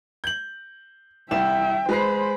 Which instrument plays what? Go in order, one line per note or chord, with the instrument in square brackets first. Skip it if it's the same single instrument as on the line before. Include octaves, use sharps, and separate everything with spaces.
[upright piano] G6 F#7
[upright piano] C2 E4 E7 [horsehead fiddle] E5 G5
[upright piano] G#3 B4 C7 [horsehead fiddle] C5 B5